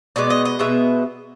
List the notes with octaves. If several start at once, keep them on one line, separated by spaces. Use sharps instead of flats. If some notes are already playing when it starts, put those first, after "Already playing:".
B2 G#3 B3 D5
D#5
D#5
B2 G#3 B3 E5